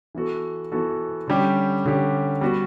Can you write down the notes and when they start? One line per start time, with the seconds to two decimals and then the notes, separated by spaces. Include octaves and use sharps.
0.15 E3 B3 F#4 A4
0.72 E3 B3 F#4 A4
1.28 D3 G3 C#4 G4
1.85 D3 G3 C#4 G4
2.41 G3 B3 F#4